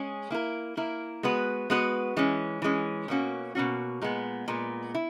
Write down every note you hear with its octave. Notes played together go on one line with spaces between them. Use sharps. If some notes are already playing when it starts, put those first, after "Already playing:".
Already playing: G#3 C#4 G#4
A#3 E4 A#4
A#3 E4 A#4
G#3 B3 F#4 B4
G#3 B3 F#4 B4
E3 G#3 C#4
E3 G#3 C#4
B2 A#3 C#4 F#4
B2 A#3 C#4 F#4
A#2 G#3 B3
A#2 G#3 B3
E4